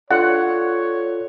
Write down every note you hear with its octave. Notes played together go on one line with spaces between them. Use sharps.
D4 F4 A4 C#5 D5 F#5